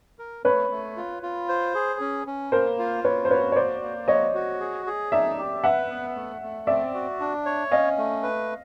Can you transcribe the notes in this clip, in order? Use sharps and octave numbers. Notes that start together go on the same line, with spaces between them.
A#4
A3 B4 C#5
A3
F4
F4
C5
G#4
C#4
C#4
A#3 A#4 C5
F4
A#3 B4 C#5
C5
F#4 B4 C#5
C#5
A#3 C5 D5
A#3
F#4 C#5 D#5
F#4
G#4
G#4
D#4 D5 E5
G4
B4 E5 F#5
B3
A3
A3
C4 D5 E5
F#4
D4
C#5
C#4 D#5 F5
A3
B4